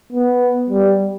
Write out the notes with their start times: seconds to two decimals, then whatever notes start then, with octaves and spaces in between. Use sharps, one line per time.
0.12 B3
0.70 G3